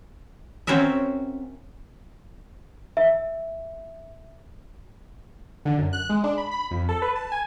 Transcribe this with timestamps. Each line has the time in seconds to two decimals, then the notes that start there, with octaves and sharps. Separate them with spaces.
0.67 C4 C#4 F#4 A#4 E5
2.97 E5
5.65 D3
5.78 F#2
5.93 F#6
6.09 G#3
6.24 D4
6.38 B5
6.51 B5
6.71 F2
6.89 A4
7.02 B4
7.15 A5
7.32 G#5